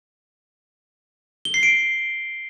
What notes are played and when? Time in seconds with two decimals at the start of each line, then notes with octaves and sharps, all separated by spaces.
1.45 G7
1.54 C7
1.63 D7